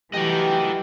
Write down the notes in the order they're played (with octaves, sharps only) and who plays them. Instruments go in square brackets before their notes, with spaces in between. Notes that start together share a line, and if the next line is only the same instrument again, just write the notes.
[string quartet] E3 [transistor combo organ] F#3 G3 A3 [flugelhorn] G4 [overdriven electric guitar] D#5 G5